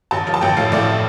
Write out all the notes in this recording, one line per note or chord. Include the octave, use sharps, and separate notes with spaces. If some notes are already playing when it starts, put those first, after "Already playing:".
A1 A5
F3
A5
A1 G5
A2 F5
A2 D5